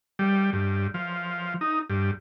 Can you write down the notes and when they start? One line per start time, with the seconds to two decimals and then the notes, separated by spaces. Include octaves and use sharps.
0.19 G3
0.53 G2
0.94 F3
1.61 D#4
1.90 G2